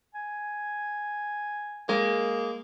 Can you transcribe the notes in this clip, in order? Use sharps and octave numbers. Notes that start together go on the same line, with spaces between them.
G#5
G#3 A#3